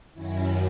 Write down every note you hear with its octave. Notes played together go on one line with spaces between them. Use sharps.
F#2 D#3 F#3 C#4 E4